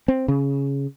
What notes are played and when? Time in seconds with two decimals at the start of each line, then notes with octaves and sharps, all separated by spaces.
0.08 C4
0.28 C#3